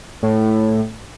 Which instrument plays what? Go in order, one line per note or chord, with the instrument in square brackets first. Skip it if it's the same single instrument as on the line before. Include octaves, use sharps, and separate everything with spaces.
[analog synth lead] A2